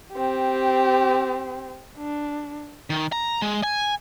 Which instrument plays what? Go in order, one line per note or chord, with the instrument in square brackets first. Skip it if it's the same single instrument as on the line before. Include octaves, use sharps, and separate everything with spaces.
[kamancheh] C4 G4
D4
[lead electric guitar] D#3
A#5
G#3
G#5